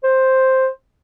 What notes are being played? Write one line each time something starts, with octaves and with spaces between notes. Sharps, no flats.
C5